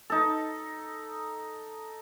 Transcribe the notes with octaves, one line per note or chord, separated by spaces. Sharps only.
D#4 A4